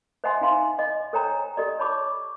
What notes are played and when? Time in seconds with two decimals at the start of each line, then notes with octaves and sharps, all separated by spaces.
0.24 C5 D#5 E5 F#5 G#5 C6
0.41 D#4 F5 G#5 C6
0.79 D#5
1.13 A4 C5 C#5 G5 G#5 A#5
1.57 G4 A4 D5 D#5
1.79 C#5 A5 B5 C#6 D6